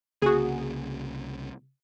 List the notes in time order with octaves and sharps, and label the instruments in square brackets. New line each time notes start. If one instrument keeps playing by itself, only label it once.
[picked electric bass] C2 C#3 A#3 [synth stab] F#4 G#4